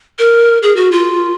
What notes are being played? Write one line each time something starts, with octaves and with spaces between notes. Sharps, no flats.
A#4
G#4
F#4
F4